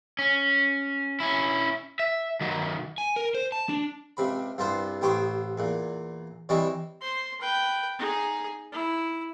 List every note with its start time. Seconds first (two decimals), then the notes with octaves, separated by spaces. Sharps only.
0.19 C#4
1.20 C#4 E4
1.99 E5
2.41 D#3 F#3
2.98 G#5
3.16 A#4
3.34 C5
3.52 A5
3.69 D4
4.17 C#2 C3 B5
4.58 C2 G2 B3 F4 C5
5.01 A1 B3 G4 C5 C#6 D#6
5.58 E2 A#2
6.49 C3 E3 G3 E4 C#5 D#5
7.01 C5 C6
7.40 B4 G5
7.99 D#4 G#4
8.72 E4